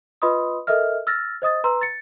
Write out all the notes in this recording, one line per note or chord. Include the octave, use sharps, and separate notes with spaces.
F4 B4 D#5 B5 C6 D#6
A4 A#4 D#5 E5 F6
E6 F6 A6 A#6
C5 D#5 D#6 A6
B4 A#5 C6 E6
A6 C#7